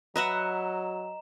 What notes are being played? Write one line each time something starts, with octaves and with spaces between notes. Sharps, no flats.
F#3 B4 D#5 E5 F#5 A#5 E7